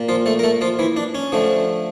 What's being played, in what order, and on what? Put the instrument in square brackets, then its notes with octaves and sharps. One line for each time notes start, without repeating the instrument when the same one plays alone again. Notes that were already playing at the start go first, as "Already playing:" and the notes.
Already playing: [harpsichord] A#2
F3 F4
A3 A4
A#4
A3 A4
F3 F4
E3 E4
D4
C#4
D3 F3 A3